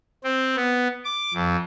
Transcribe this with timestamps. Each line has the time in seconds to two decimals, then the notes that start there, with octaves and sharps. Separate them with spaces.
0.24 C4
0.56 B3
1.05 D6
1.34 F2